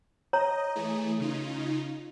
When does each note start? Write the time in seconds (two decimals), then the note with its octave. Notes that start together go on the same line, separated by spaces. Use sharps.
0.33 C#5 D#5 A#5
0.75 E3 A3 G#4
1.20 C#3 D#4 F4